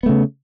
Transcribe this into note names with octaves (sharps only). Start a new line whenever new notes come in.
C#3 A3 B3